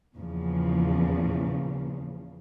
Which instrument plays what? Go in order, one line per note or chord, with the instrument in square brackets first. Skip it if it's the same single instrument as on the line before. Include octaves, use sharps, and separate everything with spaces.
[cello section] E2 A#2 C#3 F3